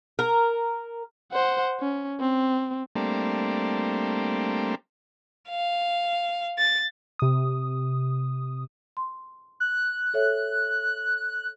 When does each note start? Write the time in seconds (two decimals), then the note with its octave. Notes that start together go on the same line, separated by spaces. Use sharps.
0.19 A#4
1.32 C5 F#5
1.80 C#4
2.20 C4
2.96 G3 A3 A#3 C4 D4
5.49 F5
6.58 A6
7.19 C3 D#6
8.97 C6
9.60 F#6
10.14 A4 C#5 E5